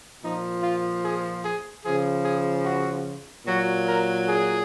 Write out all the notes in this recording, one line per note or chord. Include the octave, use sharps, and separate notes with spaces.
A#2 F3 D#4
F4
G#4
G#4
C#3 F3 G#4
G#4
F#4
A#2 F#3 F#4
A#4
G#4